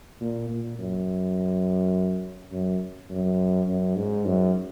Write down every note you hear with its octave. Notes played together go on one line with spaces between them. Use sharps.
A#2
A#2
F#2
F#2
F#2
F#2
G#2
F#2